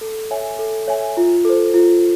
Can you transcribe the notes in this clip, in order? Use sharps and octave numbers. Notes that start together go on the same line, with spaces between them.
A4
C#5 E5 G#5
A4
C#5 E5 G#5
F4
A4 C5
F4